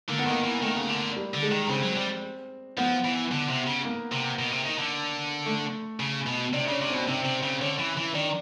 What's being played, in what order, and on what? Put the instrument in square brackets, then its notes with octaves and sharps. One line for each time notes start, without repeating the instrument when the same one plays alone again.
[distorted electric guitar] D3 [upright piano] A#3
[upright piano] B3
[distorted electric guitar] D#3 [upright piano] A#3
[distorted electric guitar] E3
[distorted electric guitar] D#3 [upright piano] A3
[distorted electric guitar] C#3
D3
[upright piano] G3
[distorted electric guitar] D3
[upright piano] G#3
[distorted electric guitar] D#3
[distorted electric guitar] C#3 [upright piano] C4
[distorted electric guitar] F#3
G3
[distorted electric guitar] F3 [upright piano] B3
[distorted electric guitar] E3
D3
C3
C#3
[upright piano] A#3
[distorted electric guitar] C3
B2
C3
D#3
D3
[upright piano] A3
[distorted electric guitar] C#3
B2
[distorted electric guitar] C3 [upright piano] D4
[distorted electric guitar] C#3 [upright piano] C#4
[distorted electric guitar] C3
[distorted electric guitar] B2 [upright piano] C4
[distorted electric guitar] C3 [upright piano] C4
[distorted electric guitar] C3
C#3
[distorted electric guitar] D3 [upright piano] C#4
[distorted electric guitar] E3
E3
[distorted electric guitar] D#3 [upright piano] D4